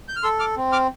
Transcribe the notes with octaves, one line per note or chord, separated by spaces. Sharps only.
G6
F6
A4 C6 E6
D6 F6
C4
D6 F6